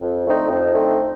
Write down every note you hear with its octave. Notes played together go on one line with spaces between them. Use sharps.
F2
D3 A3 C4 D#4
F2
D3 A3 C4 D#4